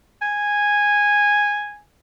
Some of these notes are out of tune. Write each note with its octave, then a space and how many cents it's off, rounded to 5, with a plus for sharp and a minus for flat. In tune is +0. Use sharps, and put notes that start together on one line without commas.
G#5 -10